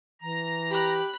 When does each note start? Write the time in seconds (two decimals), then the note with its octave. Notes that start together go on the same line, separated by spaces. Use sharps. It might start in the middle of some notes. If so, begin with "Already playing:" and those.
0.22 E3 A#5
0.71 G4 B5 F#6